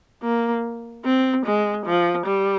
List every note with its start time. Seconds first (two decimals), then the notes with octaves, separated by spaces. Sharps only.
0.23 A#3
1.05 C4
1.46 G#3
1.86 F3
2.26 G3